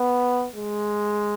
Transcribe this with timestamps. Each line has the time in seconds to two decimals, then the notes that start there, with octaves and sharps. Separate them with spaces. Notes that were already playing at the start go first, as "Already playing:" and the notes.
Already playing: B3
0.53 G#3